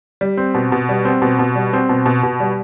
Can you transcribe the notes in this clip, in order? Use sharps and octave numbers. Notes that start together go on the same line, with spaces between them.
G3
C4
B2
B2
G3
C4
B2
B2
G3
C4
B2
B2
B2
G3